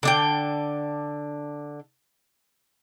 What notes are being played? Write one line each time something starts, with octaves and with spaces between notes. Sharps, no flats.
D3 D4 G5